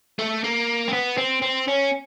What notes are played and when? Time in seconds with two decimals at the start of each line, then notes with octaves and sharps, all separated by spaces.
0.19 A3
0.44 A#3
0.88 C4
0.93 B3
1.17 C4
1.42 C4
1.68 C#4